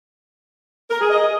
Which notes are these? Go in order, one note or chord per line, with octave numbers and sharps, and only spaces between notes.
A#4
G#4
D#5